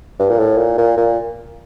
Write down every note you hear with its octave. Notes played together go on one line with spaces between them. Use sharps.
G2
A#2
A2
A#2
A#2
A#2